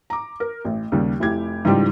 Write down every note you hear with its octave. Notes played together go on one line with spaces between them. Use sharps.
A#5 D6
A#4
A1
D#2 C#3 G3
F1 E4 G4 G#6
G#2 C#3 E3 G3 F4 G4